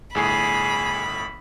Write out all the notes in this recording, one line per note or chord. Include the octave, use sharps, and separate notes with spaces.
G1 A2 G#4 B5 C7